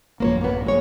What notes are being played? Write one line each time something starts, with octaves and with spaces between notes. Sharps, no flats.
A1 F#2 F3 A#3 C5 C#5
A#3 B3
G2 G#3 C#5